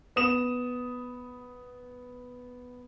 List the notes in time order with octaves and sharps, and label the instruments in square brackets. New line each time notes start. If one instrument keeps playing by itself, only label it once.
[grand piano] B3 D#6 E7